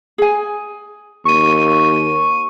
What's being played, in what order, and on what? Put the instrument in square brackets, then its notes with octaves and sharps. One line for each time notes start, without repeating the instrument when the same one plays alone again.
[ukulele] G#4 G#5
[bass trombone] D#2 [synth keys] C#6 D#7